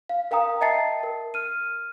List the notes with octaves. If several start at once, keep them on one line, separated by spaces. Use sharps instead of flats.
F5
A#4 F5 G5 A#5 D#6
D#5 E5 G5 A5 A6 C7
A#4
F6 D#7